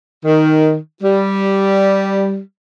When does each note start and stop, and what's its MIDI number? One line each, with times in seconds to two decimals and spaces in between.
0.24 0.76 51
1.02 2.39 55